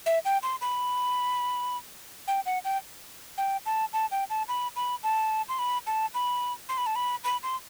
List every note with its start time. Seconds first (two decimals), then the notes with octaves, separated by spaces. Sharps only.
0.06 E5
0.25 G5
0.43 C6
0.61 B5
2.28 G5
2.46 F#5
2.64 G5
3.38 G5
3.66 A5
3.93 A5
4.11 G5
4.30 A5
4.48 B5
4.76 B5
5.03 A5
5.49 C6
5.59 B5
5.87 A5
6.14 B5
6.69 C6
6.78 B5
6.86 A5
6.96 B5
7.24 B5
7.43 C6